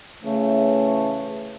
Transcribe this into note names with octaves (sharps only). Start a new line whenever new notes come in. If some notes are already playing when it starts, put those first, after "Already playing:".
C#3 E3 A3